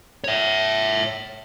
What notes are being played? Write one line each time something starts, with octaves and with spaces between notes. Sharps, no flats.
C#5 E5